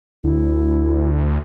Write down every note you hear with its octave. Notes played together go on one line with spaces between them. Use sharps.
D2 E4